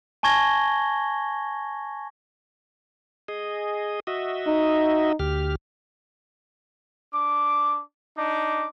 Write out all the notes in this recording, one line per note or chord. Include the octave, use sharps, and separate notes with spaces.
G#5 A5 C#6 G#6 A#6 G7
G#4 D#5
F#4 D#5 E5
D#4
D2 G4 F6
D4 D6
D4 D#4 D6